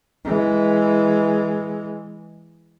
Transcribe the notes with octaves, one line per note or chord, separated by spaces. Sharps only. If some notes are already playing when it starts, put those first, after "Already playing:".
E3 G#3